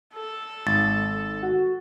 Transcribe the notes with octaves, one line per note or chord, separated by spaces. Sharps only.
A4
G#1 A6
F#4